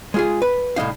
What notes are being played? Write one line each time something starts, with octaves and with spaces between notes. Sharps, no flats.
G#3 F4 G#4
B4
C2 A2 E3 D#4 F5